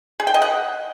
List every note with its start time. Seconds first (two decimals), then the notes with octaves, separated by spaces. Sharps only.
0.20 G#4
0.27 G5
0.34 D#5
0.42 F#5